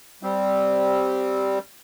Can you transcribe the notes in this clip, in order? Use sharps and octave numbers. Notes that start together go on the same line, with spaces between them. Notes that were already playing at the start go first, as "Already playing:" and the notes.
G3 C4